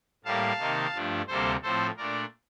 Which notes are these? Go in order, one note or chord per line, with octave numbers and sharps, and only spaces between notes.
A2 G3 A#3 F5 A5
C3 D#3 A#3 D#4
G2 F3 A3 D4
D2 C3 G3 A#3 A4 C5
A2 F3 C4 A4 C5
A#2 A3 D4 A#4 D5